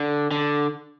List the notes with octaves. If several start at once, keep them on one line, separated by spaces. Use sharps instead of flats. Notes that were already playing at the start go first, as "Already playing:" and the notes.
Already playing: D3
D3